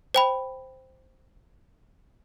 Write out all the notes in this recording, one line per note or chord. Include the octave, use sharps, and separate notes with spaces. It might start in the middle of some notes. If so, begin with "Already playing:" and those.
C5 G5 B5